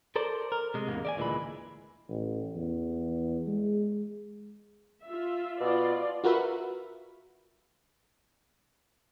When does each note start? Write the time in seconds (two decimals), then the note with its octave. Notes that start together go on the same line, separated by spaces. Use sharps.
0.16 A4 A#4 C5 D5
0.52 A#4
0.74 C3 G#3
0.88 E2 G#2 C#3 A#3
1.05 D5 E5 G#5
1.17 D2 A#2 E3 G#3 B5
2.09 A1
2.56 E2
3.47 G#3
5.03 F4 E5
5.60 B2 F4 D5
6.24 F4 F#4 A#4 B4 E5